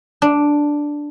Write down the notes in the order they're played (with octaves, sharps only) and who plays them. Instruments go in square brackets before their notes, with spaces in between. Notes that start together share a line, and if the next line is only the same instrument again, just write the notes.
[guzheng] D4